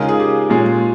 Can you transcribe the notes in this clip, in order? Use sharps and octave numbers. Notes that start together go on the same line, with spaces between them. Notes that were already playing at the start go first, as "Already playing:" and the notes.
Already playing: C#3 G#3 D#4 F4 A#4
G#4
G4
A#2 G#3 C#4 G#4